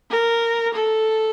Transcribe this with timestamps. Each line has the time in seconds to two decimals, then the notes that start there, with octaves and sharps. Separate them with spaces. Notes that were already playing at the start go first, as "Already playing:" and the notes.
0.11 A#4
0.74 A4